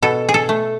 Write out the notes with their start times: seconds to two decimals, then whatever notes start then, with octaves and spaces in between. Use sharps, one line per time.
0.02 B2 A4
0.29 G#4
0.34 A4
0.49 A3